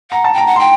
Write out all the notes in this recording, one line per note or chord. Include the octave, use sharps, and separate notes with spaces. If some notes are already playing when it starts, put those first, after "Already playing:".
F#5 A#5
A5
G5 A#5
F#5
G5 C6